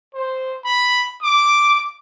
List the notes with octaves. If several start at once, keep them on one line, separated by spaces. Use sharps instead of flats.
C5
B5
D6